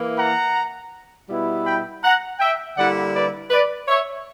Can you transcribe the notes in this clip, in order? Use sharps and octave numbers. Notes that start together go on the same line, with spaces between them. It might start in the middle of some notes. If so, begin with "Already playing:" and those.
Already playing: E3 A#3 E4
F#5 A#5
B2 G3 B3 E4
G5 B5
F#5 A#5
E5 G5
D3 G3 A#3 E4 D5 F#5
B4 D5
B4 D5
C#5 E5